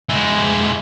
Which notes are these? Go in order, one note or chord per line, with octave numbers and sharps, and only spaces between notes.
G#3 E4